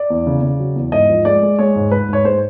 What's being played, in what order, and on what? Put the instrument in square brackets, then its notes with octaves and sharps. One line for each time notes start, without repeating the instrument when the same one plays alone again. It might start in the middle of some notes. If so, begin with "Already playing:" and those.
Already playing: [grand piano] D5
E2
C#3
C#3
F#3
E2
G#2 D#5
F3
G#3 D5
G#3
G#3 C#5
G#2
G#2 B4
G#2 C#5
G#3 C5